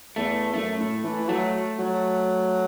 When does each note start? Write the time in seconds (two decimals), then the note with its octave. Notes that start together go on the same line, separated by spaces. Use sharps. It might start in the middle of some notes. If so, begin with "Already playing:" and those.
0.16 E2 A3
0.54 F#2 A3
0.79 A2
1.04 E3
1.29 F#3 A3
1.79 F#3